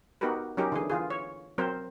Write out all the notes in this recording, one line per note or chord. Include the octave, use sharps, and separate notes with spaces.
B3 D#4 F#4 G4 A#4 B4
F#3 C#4 D#4 G4 A#4
D3 E3 G#4
E3 F4 G#4
C#5
F#3 C4 A#4 C5